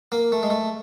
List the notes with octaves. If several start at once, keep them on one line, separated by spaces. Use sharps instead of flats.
A#3
A3
G#3
A3